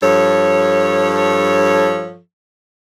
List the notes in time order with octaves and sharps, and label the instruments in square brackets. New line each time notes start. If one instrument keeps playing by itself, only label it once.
[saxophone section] G2 F3 A4 C#5